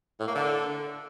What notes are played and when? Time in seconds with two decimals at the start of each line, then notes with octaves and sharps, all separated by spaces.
0.19 A2
0.27 A#3
0.35 D3